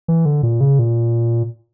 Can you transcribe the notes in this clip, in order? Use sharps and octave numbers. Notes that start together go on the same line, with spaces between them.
E3
D3
A#2
C#3
A#2